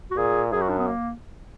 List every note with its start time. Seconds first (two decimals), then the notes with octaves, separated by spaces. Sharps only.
0.11 F#4
0.17 A#2 G#4
0.52 F#2 G#4
0.62 F#4
0.70 D4
0.79 B3
0.87 A#3